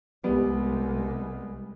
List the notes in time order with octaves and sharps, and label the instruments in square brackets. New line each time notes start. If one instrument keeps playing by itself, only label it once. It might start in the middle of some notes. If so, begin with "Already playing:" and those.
[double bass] C2 G#3 [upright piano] G3 B3